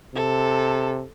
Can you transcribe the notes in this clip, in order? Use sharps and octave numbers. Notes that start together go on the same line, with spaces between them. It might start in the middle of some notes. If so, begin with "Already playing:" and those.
C3 A4